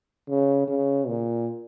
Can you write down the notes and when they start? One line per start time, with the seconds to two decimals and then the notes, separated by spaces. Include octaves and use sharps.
0.29 C#3
0.68 C#3
1.07 A#2